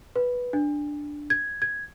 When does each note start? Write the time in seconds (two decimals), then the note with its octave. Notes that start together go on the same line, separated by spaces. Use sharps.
0.16 B4
0.53 D4
1.30 G#6
1.62 G#6